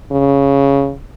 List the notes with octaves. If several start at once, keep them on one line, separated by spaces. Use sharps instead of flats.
C#3